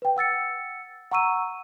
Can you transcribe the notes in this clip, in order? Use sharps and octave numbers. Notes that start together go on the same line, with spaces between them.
B4 G5
F#5 E6 A6 C#7
F#5 A#5 C#6 E6 D#7